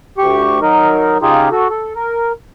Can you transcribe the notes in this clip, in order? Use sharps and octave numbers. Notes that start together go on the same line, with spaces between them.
D2 G4 C#6
F#3 D#4 A#4
C#3 D#4 F4 G4 G#4
F#4 A4
A4
A#4